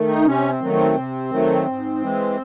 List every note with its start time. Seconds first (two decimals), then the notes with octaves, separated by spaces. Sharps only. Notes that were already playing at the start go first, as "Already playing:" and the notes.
Already playing: D#3 A3
0.08 D#4
0.25 C3 C#4
0.49 C4
0.61 D#3 F#3 A3
0.73 C4
0.95 C3
1.31 D#3 F#3 A3
1.67 G#2
2.01 E3 G#3